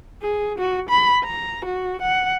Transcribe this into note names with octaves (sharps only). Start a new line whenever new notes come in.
G#4
F#4
B5
A#5
F#4
F#5